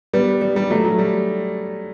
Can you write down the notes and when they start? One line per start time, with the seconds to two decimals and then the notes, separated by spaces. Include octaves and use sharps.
0.13 G3 B3
0.41 G3
0.56 G3
0.70 F#3 A3
0.84 F#3
0.99 G3